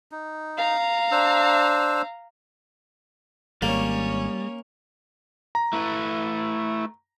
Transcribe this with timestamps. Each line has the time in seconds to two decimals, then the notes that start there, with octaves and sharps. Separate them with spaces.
0.12 D#4
0.58 F5 A#5
1.11 D4 C5 E6
3.62 G#1 G3 A#3 C#4 C#5
5.55 A#5
5.73 A3 E4 B4